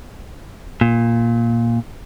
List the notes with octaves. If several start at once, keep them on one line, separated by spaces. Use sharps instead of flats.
A#2